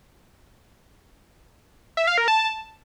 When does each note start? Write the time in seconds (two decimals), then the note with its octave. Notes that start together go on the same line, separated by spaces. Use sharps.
1.97 E5
2.07 F5
2.18 A#4
2.28 A5